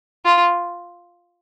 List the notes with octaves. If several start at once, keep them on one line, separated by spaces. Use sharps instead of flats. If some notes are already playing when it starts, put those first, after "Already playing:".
F4